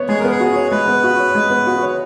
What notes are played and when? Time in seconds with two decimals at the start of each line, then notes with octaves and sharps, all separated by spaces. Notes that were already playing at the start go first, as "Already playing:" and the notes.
Already playing: B3 C#5
0.09 G#3 G#4
0.19 B3 A#4
0.31 G#4
0.40 F#4
0.56 C#5
0.71 G#3 B4
0.88 B3
1.04 F#4
1.19 C#5
1.35 G#3
1.50 B3
1.67 F#4
1.82 C#5